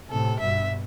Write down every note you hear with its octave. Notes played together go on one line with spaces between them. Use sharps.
A2 C3 A4
G2 B2 E5